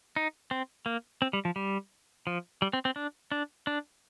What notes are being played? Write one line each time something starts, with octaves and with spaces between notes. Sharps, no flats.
D#4
C4
A#3
C4
G3
F3
G3
F3
G3
C4
C4
D4
D4
D4